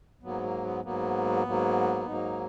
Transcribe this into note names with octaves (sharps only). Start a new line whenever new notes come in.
G#2 F#3 A#3 B3
A#3
B3
G#2 F#3 A#3 B3
G#2 F#3 A#3
G#2 F#3 A#3 D#4